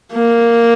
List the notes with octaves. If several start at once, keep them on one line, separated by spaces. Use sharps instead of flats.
A#3